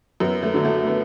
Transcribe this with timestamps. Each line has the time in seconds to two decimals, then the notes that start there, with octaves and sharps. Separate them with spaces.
0.20 F#2 B3
0.43 A3
0.54 D3 F#3
0.65 A3
0.87 B3